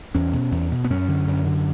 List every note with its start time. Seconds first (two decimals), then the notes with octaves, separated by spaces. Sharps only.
0.15 E2 C#4
0.33 B2
0.52 E2
0.72 B2
0.84 B3
0.90 F#2 C#4
1.08 D3
1.27 F#2
1.46 D3